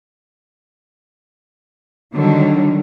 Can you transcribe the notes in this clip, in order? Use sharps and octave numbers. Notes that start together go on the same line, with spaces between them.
D3 D#3 F#3 G3